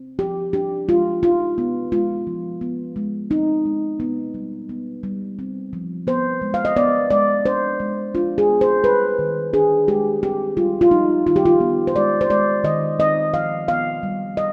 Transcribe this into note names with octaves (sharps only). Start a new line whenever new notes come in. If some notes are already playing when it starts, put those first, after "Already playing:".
Already playing: C4
F3 G4
D4 G4
G#3 F4
D#4 F4
B3
G#3 F4
F3
B3
G#3
C4 D#4
G#3
B3
G3
B3
G3
C4
F3
B3 C5
G#3
F5
D#5
B3 D5
G#3 D5
D4 C5
G#3
D4 F4
G#4
B3
C5
G3 B4
D#3
D4 G#4
G#3 G4
C4 G4
G3 F4
F4
G3 D#4
D#3 F4
G4
F4
B3
C5
G#3 D5
C5
G#3 D5
D#3 D#5
C4 D#5
F3 F5
B3 F5
G3
D#5